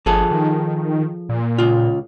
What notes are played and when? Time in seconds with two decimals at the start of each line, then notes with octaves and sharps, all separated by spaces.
0.06 G1 F3 G#4 A4
0.31 D#3
1.29 A#2
1.58 C#2 F4